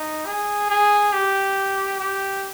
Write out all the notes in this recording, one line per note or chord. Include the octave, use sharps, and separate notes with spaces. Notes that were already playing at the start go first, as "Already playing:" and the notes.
Already playing: D#4
G#4
G#4
G4
G4